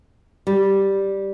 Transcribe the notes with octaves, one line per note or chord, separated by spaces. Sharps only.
G3